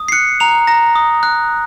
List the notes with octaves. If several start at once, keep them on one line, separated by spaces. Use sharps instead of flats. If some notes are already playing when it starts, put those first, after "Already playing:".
Already playing: D#6
C7
F#6 C#7
A#5 F7
A#5 A#6
D#6
F#6